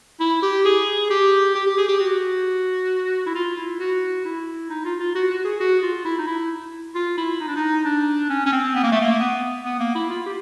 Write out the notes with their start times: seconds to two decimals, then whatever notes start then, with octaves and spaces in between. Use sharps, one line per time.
0.20 E4
0.42 G4
0.65 G#4
1.10 G4
1.55 G4
1.66 G4
1.77 G#4
1.88 G4
2.00 F#4
3.26 E4
3.34 F4
3.57 E4
3.80 F#4
4.25 E4
4.70 D#4
4.85 F4
4.99 F4
5.15 F#4
5.30 F#4
5.44 G#4
5.60 F#4
5.82 F4
6.05 E4
6.18 D#4
6.27 E4
6.95 F4
7.17 E4
7.40 D#4
7.47 D4
7.56 D#4
7.85 D4
8.29 C#4
8.46 C#4
8.52 C4
8.75 B3
8.83 A#3
8.92 A3
9.01 A#3
9.19 B3
9.65 B3
9.80 A#3
9.95 E4
10.09 F4
10.26 G4